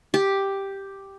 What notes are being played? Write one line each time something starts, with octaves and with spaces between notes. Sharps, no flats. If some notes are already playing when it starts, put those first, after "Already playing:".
G4